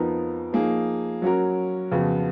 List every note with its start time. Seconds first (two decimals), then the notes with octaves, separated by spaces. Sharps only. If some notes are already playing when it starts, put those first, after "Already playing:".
Already playing: F2 F3 B3 D#4 A#4
0.53 F3 A#3 D#4 G#4
1.22 F#3 C#4 F#4 A#4
1.91 F2 C#3 F3 B3 F#4